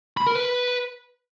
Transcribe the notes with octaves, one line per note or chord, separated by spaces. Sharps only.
B5
A#4
B4